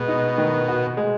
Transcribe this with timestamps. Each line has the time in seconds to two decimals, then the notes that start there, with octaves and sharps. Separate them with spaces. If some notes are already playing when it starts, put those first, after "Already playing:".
Already playing: B2 G#3
0.08 D#4
0.38 D#3
0.68 F#4
0.97 G#3